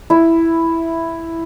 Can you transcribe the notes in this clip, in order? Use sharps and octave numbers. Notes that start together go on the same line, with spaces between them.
E4